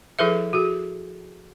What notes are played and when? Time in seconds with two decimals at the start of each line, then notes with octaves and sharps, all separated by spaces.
0.19 F3 E4 G#4 A4 B4 E5
0.53 F#4 G#4